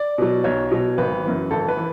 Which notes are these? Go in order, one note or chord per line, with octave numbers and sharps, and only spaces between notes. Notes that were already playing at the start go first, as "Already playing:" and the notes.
Already playing: D5
B2 F#3
B1 C#5
B2 F#3
G#1 B4
F#2 E3
G#1 A4
B4
E3